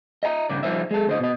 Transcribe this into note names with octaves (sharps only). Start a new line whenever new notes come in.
D#5 E5 G#5 A#5
G2 C#3 D5
F3 G3 D#4 C5 D5 E5
G#3 A4
D2 C5 D#5
B2 D#5